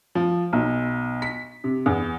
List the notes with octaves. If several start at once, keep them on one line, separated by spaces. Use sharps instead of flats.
F3
B1
B6
C3
E2